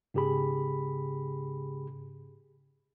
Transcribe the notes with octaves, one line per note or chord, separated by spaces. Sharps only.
G#2 C#3 G4 G#4 B5